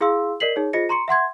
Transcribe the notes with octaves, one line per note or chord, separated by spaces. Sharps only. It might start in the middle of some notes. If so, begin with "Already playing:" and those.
E4 G#4 F5 C6 E6
A#4 D5 D#5 B6 C7 F#7
D#4 G#4 C#5
F4 G#4 C5 D#5 A#6 C#7
A#5 C6 C#6 C#7
E5 F#5 C6 G#6